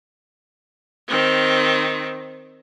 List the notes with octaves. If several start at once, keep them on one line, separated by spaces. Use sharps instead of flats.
D#3 C4